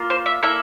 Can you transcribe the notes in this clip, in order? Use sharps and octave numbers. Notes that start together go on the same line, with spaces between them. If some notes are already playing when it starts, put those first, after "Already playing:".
Already playing: A#3 F4
C5
E5
A#3 E4 A4 E5